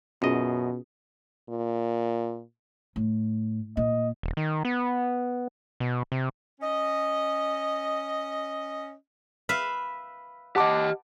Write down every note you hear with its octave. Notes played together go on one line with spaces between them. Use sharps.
F#2 B2 C#4 F4 G#4 D#5
A#2
A2
A#2 D#5
D#1
D#3
B3
B2
C3
C#4 D#5
B4 E5 F5
G4 D#5 F#5 A5 D6